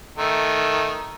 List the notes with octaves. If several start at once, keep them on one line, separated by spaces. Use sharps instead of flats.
D#3 A3